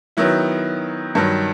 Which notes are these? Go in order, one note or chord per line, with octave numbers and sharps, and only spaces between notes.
D#3 F#3 B3 E4
G2 D#3 F#3